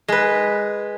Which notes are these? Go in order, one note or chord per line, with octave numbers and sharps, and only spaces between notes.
G#3 B4